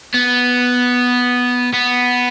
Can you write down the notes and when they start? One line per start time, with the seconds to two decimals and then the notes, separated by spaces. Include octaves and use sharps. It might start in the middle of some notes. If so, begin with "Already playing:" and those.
0.14 B3
1.73 B3